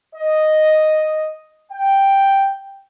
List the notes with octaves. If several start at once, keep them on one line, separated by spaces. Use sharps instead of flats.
D#5
G5